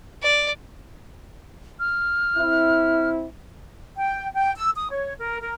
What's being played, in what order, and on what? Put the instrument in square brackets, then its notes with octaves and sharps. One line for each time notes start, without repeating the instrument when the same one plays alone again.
[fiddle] D5
[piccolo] F6
[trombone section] C4 E4
[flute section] G5
G5
E6
D#6
C#5
A#4
A#4